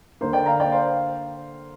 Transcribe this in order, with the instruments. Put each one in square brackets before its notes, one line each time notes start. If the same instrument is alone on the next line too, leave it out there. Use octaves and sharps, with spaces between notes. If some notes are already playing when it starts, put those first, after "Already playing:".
[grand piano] D3 A#3 C5
D5 G5
F5 A#5
D5 G5
C5 F5